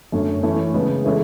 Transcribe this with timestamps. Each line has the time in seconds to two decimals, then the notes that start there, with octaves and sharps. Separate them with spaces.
0.12 F#2 D3 A3 C#4
0.43 E3 A3 C#4
0.74 C#3 G#3 B3
1.04 E3 G#3 C#4 E4 A4